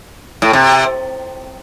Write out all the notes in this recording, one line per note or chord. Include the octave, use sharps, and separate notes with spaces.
A2
C3